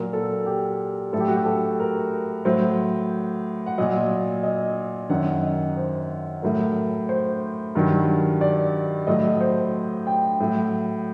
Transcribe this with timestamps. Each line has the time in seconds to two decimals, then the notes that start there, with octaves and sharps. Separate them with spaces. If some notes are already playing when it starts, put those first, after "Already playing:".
Already playing: A#2 F#3 A#4
0.13 A4
0.46 G4
1.13 A2 A4
1.17 F#3 G4
1.28 F#4
1.36 G4
1.46 A4
1.80 A#4
2.45 A2 F#3 C5
3.66 F#5
3.78 A#2 F#3 D#5
4.43 D#5
5.09 F#2 D#3 F#3 F#5
5.43 D#5
5.77 C5
6.42 A2 F#3 A#4
7.09 C5
7.75 G2 D#3 F#3
8.41 D5
9.07 A2 F#3 D#5
9.41 C5
10.07 G5
10.40 A2 F#3